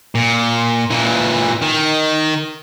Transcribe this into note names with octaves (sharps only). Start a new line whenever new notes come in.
A#2
A#2 E3
D#3